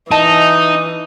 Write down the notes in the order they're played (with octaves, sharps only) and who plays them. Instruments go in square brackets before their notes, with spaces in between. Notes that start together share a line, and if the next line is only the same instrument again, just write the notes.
[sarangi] E3 [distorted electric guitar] D#4 [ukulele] D#5 A5 [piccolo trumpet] D#6